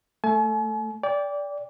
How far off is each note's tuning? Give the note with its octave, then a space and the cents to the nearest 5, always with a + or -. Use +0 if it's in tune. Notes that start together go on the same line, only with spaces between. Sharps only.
A3 +5 G#5 +45
D5 -20 G5 +20